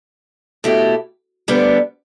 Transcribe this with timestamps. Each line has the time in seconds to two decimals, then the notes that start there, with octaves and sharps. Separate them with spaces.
0.64 B2 A3 E4 G4
1.48 D2 D3 G3 B3 D4